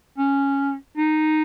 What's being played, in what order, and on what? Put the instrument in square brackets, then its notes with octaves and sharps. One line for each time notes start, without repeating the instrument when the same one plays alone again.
[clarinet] C#4
D#4